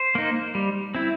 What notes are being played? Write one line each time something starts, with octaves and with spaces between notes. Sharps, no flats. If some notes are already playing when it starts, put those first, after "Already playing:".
Already playing: C5
A#3 D#4
G3
C4 E4